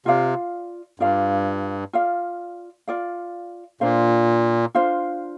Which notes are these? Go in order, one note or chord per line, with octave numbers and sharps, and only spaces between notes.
C3 F4 D5 F5
G2 F4 D5 F5
F4 D5 F5
F4 D5 F5
A#2 D4 F4 C5 F5
D4 F4 C5 F5